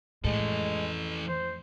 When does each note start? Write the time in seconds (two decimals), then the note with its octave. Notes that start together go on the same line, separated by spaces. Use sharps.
0.24 F2 A2 E3 G#3 A4
1.28 C5